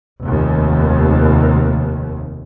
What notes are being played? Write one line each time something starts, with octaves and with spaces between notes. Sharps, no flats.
F1 D#2